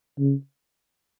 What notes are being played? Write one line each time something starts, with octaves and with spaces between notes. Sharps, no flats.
C#3